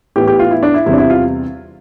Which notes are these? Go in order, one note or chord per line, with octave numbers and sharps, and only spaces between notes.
A2 E3 B3 G4
G4
F4
E4
D4
E4
E2 C3 G3 C4 E4
D4
E4
F4